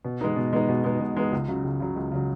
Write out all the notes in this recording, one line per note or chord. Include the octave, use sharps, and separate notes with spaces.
B2
G#3 B3 D#4
B2
G#3 B3 D#4
B2
G#3 B3 D#4
B2
G#3 B3 D#4
C#2
C#3 F#3
C#2
C#3 F#3
C#2
C#3 F#3